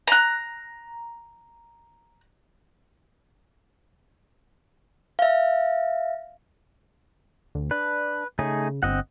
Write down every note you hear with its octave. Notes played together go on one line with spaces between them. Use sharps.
A#5 F#6
E5 F5
D2
D4 B4
C#3 A3 D#4 G#4
G1 C4 D#5 F#5